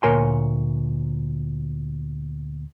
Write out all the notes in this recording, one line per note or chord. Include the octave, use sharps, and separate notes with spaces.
D2 A#2 A#4 C#5 G#5 C6